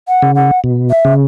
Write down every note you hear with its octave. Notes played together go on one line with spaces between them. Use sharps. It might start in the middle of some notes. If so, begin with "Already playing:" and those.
F#5
C#3
F#5
B2
E5
C#3